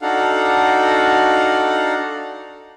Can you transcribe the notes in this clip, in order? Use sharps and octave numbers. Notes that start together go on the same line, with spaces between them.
D4 D#4 F#4 A4 F5 F#5